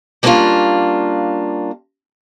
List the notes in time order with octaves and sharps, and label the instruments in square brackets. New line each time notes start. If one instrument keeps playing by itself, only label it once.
[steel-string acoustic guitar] G3 A#3 B3 C#4 D4 F4